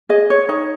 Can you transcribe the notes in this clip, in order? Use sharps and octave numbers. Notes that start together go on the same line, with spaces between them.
G#4 D#5
C#5
D#4 C#5